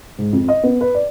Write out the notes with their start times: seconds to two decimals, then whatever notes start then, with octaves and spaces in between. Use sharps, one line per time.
0.18 G#2
0.33 F2
0.48 D#5
0.63 B3
0.81 B4
0.95 D5